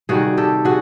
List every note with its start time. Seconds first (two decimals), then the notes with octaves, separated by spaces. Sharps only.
0.09 C3 D#3 G3 F#4 G#4
0.37 G4 A4
0.65 F#4 G#4